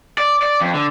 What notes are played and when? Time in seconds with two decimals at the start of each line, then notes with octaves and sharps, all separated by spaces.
0.18 D5
0.43 D5
0.61 F2
0.75 D3